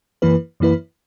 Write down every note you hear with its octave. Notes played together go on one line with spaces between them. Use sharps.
F#2 E3 A#3 E4 B4
F#2 E3 A#3 E4 B4